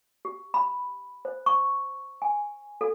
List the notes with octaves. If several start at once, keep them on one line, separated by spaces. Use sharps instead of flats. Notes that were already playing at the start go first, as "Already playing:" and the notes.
G4
B5
C5
C#6
G#5
A4